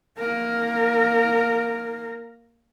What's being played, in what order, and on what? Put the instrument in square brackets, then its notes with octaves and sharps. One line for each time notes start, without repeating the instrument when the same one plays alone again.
[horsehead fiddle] A#3 A#4